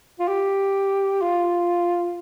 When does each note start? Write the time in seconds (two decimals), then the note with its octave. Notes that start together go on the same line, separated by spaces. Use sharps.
0.20 F4
0.28 G4
1.21 F4